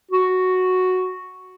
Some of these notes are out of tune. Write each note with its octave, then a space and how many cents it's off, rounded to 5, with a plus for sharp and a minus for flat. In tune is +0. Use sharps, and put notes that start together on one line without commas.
F#4 +0